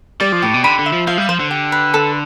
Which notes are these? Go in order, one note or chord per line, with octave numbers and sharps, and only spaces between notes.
G3 D5
F3
A2 G4
B2
D3 B5
D3
E5
F3
F3 F5
G3
F3 C5
D3
G4
B4
A4